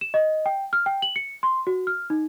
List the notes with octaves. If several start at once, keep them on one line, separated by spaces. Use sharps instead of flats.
E7
D#5
G5
F6
G5
F#7
C#7
C6
F#4
F6
D#4